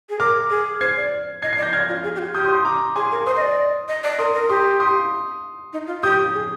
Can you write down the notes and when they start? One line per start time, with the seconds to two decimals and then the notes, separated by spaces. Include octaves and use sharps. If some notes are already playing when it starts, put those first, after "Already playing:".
0.10 G#4
0.19 A#4 D6 F6
0.50 G#4
0.80 C5 G#6 C7
0.96 D5
1.42 D#5 G#6 C7
1.53 G#6 C7
1.58 D5
1.62 G6 A#6
1.73 D5 F6 G#6
1.88 F4
2.04 G#4
2.15 G4
2.19 F4
2.34 G4 D#6 G6
2.45 C6 D#6
2.55 C6 D#6
2.65 A#5 D6
2.96 G#4 G#5 C6
3.11 A#4
3.26 C5 C6 D#6
3.36 D#5
3.42 D5
3.88 D#5
4.04 D5
4.18 A#4 C6 D#6
4.34 A#4
4.49 G4 C6 D#6
4.80 C6 D#6
5.73 D#4
5.87 F4
6.03 G4 D#6 G6
6.34 G#4